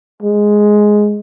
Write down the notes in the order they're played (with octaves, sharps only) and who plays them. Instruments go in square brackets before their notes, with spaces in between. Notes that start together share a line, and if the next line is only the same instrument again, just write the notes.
[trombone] G#3